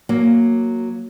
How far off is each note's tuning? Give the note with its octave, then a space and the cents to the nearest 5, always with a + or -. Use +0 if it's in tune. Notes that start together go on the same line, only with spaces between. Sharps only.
F#3 +0 A#3 +0